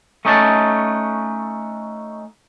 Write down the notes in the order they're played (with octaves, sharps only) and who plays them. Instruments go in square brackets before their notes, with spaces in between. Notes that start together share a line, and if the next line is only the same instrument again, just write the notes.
[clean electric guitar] A3 C#4 D#4 F#4 D#5 A5